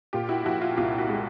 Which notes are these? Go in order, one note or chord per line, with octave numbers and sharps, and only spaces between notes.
A#2 F4 G4
E4 F#4
F3 E4 F#4
F4
C2 F4 G4
E4 F#4
G#3